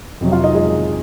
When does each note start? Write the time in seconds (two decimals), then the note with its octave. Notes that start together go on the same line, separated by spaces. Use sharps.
0.21 F2 C3 F#3
0.32 F4 F5
0.44 D#4 D#5
0.55 G#3 G#4